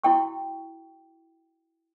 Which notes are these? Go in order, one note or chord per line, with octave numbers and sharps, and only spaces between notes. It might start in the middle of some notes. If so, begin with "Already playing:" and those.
E4 F#4 G5 C#6